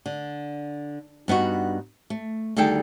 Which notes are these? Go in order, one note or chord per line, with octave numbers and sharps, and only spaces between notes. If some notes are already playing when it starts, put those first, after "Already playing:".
D3
G2 B3 D#4 F#4
A3
D2 D#3 G3 G#4 A4 G5